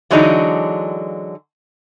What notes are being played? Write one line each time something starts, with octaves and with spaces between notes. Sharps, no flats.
D3 E3 F#3 G#3 D4 D#4